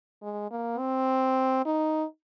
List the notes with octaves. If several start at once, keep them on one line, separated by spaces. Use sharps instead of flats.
G#3
A#3
C4
D#4